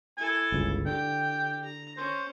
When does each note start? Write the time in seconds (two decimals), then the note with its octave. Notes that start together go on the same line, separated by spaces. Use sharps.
0.17 E4 A4 G#5
0.52 G1 C#2
0.86 D3 G4 G5
1.64 A#5
1.97 C#4 C5